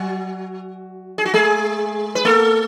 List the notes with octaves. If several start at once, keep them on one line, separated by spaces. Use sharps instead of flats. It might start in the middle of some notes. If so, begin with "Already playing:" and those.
Already playing: F#3 F#4
G#4
F#4
G#3 G#4
B4
A3 A4